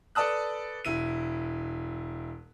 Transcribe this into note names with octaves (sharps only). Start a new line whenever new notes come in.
A4 B4 D5 A5 D#6 F#6
E1 E4 D#7